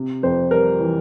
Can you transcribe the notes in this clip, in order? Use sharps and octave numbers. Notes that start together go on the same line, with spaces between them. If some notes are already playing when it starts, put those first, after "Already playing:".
Already playing: C3
F2 C5
G3 A#4
E3